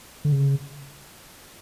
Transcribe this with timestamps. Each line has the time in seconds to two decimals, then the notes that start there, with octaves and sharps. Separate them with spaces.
0.25 D3
0.32 C#3